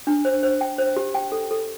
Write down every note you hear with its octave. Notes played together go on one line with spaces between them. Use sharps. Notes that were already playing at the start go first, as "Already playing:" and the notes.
D4
C5
C5
G5
C5
G4
G5
A4
A4